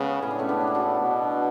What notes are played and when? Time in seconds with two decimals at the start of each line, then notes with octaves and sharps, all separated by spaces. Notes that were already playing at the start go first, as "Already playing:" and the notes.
Already playing: C#3 G#3 B3
0.22 A2 C#4
0.31 D4
0.39 A3 C#4
0.49 B3 D4
0.60 D4
0.67 E4
0.74 D4 F#4
1.01 B2